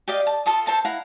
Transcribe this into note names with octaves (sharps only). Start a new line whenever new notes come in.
G4 D5 D#5 F5
A5
F4 A4 A5 D#6
A4 C5 A5 A#5
E4 F5 F#5 A#5